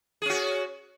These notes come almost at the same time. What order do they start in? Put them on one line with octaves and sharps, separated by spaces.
G#4 C#4 F#4